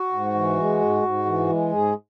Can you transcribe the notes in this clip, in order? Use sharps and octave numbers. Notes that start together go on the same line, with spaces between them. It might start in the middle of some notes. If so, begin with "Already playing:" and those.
Already playing: F#4
G#2
E3
G#3
G#2
G#2
E3
G#3
G#2 G#4